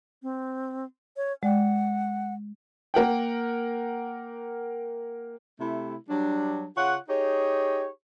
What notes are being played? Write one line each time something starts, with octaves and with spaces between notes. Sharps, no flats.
C4
C#5
G#3 D5 F#5 G5
A#3 A#4 F#5 G5
C3 A3 E4
F#3 G3 D4
C#3 F4 C#5 F#5
D#4 G4 G#4 C#5